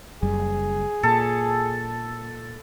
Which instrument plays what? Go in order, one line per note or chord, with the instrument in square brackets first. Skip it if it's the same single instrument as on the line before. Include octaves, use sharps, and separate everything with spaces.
[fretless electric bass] F#1 F#2 G3 [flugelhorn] G#4
[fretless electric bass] A#2 [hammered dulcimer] A4